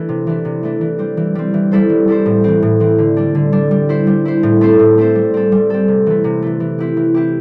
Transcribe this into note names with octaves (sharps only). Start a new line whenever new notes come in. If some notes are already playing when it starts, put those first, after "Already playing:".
Already playing: E3 A3 D4
C3
E3 A3 D4
C3
E3 A3 D4
E3
G3 C4
E3
G3 C4
E3
G3 E4 A4 C5
E3
G3 E4 A4 C5
A2
E3 C4
A2
E3 C4
D3
G3 D4
D3
G3 D4
G3
E4 C5
G3
E4 C5
A2
A3 C4 A4 C5
A2
A3 C4 A4 C5
G3
C4 A4
G3
C4 A4
C3
E3 A3
C3
E3 A3
E3
C4 E4 G4
E3
C4 E4 G4